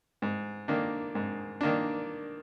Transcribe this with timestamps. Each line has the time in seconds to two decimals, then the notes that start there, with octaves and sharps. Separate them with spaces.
0.22 G#2
0.68 D#3 A#3 D4
1.15 G#2
1.61 D#3 A#3 D4